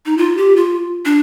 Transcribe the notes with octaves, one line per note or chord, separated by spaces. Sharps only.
D#4
F4
G4
F4
D4